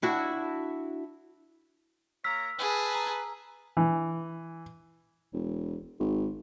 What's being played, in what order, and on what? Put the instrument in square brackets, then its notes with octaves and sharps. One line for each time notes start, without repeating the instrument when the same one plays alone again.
[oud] D4 E4 F#4
[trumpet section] A#3 C#5 A#5 [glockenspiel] E6 F6 B6
[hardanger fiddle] G#4 A5 [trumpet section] B4
[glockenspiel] A#5
[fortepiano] E3
[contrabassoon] E1
G#1